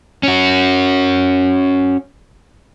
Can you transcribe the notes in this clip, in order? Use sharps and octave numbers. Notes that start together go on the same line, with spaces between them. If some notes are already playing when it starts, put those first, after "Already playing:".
C#4 F#4